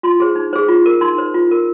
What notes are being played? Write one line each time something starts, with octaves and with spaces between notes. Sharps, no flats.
F4 C6
G#4 C5
D#4
G#4 C5
F4
A#4
D#4 C6
C5
F4
A#4